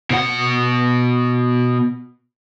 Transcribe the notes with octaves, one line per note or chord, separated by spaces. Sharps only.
B2 F#5